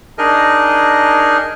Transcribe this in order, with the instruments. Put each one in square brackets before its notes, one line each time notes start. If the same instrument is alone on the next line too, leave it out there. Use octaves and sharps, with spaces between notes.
[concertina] D4 D#4 G#4 A#4 D#5